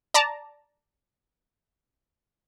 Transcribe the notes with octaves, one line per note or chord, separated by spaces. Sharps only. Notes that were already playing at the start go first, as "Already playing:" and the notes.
D5 A5 A#5